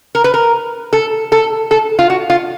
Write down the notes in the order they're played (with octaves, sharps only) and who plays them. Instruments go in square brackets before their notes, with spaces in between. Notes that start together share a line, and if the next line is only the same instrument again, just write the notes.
[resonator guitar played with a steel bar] A#4
B4
A#4
A4
A4
A4
F4
F#4
F4